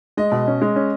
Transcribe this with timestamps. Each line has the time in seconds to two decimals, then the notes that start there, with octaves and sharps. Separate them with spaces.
0.17 G#3 D#5
0.32 B2
0.47 C#4
0.61 G#3
0.76 C#4